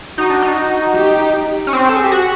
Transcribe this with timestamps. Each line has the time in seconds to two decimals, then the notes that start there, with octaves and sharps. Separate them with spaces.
0.18 D#4 F#4
0.30 D4
0.42 D#4
0.95 G4
1.67 C#4
1.73 C4
1.89 A4
1.96 G#4
2.04 G4
2.12 F#4